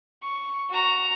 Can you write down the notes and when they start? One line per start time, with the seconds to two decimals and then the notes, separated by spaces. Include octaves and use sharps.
0.22 C#6
0.70 F#4 A#5